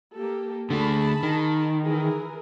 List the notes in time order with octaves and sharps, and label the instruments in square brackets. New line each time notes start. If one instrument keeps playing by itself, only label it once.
[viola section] A#3 G4 A4
[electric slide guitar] D3 A3 [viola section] G#4 A5 B5
[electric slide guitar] D#3
[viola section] E3 G#4 A#4